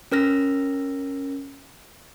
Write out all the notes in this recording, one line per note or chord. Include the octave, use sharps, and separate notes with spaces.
C#4 A#4 F6 A#6